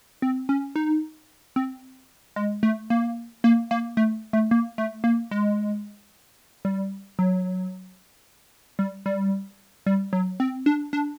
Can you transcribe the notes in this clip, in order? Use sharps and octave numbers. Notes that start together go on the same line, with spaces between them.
C4
C#4
D#4
C4
G#3
A3
A#3
A#3
A#3
A3
A3
A#3
A3
A#3
G#3
G3
F#3
G3
G3
G3
F#3
C4
D4
D4